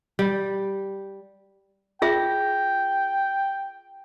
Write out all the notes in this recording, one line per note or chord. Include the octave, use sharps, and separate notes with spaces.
G3
F4 G#4 E5 G5